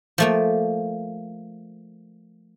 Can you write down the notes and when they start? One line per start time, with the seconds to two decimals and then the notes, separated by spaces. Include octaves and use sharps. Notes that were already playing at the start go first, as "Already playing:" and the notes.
0.18 F3 A3 A#3